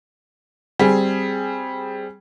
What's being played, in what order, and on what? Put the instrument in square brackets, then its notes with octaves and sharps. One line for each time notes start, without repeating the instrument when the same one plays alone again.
[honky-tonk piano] G3 C4 G#4